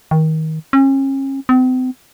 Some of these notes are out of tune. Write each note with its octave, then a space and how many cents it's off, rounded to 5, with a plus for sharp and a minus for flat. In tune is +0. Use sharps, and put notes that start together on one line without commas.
D#3 +25
C#4 -35
C4 -40